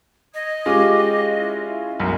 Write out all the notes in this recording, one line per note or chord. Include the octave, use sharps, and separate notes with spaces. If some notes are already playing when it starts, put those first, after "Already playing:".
D#5 D#6 G#6
G#3 C#4 F4 G4 D6
E4
B1 F#2